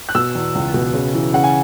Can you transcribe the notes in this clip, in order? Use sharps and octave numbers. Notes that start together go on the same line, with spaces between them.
F#6
B2 E6
E2
C#2
B2
C#3
E3
C#3 F#5
G#5